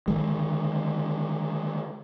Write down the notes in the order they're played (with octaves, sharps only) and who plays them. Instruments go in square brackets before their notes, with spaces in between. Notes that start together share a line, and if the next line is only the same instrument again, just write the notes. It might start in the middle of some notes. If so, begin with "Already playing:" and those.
[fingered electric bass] D3 D#3 G#3